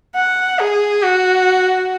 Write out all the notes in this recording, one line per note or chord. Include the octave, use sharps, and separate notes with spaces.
F#5
G#4
F#4